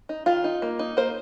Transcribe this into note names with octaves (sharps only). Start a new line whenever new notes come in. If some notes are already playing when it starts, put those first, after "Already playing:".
D#4
D#3 F4
D#4
A#3
D#4
A#3 C5